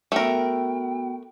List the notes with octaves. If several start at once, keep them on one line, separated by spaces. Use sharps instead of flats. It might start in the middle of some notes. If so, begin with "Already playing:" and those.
A3 B3 F#4 A#4 G5